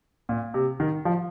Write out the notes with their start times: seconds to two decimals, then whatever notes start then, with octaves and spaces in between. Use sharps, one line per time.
0.29 A#2
0.54 C3
0.80 D#3
1.05 F3